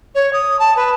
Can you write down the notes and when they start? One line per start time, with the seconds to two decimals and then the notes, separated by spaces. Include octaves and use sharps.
0.14 C#5
0.33 D#6
0.59 A5
0.76 B4